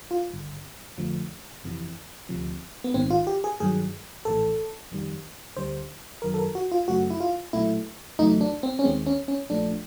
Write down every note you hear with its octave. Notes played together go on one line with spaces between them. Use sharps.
F4
G#1 G2 D3
F2 D3 F3 A3
G1 F2 C3 E3
D2 C3 F3
B3
A#1 G#2 D#3 C4
F4
G4
G#4
G2 D#3 F#3 G#4
A#1 A2 E3 A4
F2 C3 D#3 G3
D2 D3 G3 C5
G1 F#2 D#3 F#3 A#4
A4
A#4
F#4
F4
F#2 C#3 F#3 A3 F#4
E4
F4
B1 A#2 F#3 A3 E4
E2 C#3 F#3 A3 D#4
D4
C4
C#4
D#2 D#3 G#3 C4
C#4
C#4
A#1 A#2 F3 A3 D4